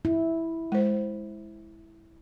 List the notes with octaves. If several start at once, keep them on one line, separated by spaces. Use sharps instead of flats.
E4
G#3 C5